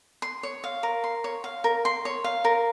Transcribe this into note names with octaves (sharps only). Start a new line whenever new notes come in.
C6
C#5
F5
A#4
C6
C#5
F5
A#4
C6
C#5
F5
A#4